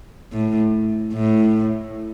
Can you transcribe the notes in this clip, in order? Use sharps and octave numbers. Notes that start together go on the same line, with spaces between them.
A2
A2